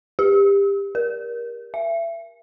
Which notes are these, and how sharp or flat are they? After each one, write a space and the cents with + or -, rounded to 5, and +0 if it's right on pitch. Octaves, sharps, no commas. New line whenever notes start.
G4 +25
A#4 +25
E5 +30